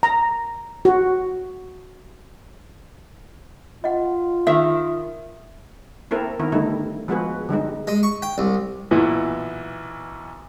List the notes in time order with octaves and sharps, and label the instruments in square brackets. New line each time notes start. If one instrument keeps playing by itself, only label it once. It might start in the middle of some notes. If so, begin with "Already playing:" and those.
[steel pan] A#5
F#4
[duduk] F4 [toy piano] D#5 F#5
[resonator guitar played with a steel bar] D#3 [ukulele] E5
[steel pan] A#3 C4 E4 A4 A#4
D#3 B3 E4 A#4
D3 G3 A3 D#4 E4
F3 G#3 B3 F#4 G#4 B4
D3 G3 G#3 D#4
[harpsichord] G#3
C#6
G5
C2
[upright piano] B1 A#2 E3 B3 E4